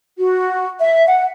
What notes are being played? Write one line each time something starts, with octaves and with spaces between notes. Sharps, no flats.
F#4
E5
F#5